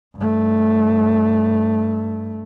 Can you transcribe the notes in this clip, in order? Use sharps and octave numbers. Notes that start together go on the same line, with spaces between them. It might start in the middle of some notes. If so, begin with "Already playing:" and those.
G2 A3